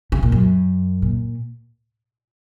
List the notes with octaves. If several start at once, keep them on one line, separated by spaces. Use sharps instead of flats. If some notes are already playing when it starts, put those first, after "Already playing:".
C#3
A#2
F#2
A#2